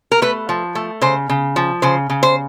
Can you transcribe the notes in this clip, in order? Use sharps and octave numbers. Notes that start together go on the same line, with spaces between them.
A#4
A3 B4
F3
A3
C#3 C5
C#3
F3
C#3 C5
C#3
C5